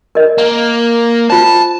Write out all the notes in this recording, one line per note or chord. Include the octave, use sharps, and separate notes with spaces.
A#4 D#5
A#3
F4 C5 A5